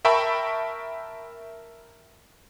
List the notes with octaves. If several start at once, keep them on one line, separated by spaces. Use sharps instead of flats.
A#4 E5 G5 A5 B5 C#6